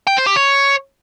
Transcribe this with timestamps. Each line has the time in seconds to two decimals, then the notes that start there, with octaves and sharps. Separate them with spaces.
0.07 G5
0.17 C5
0.26 G4
0.36 C#5